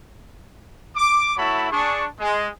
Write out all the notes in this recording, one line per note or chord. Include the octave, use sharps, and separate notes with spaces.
D6
A3 E4 F#4 C#5 A5 B5
D4 G#4 C#6
G#3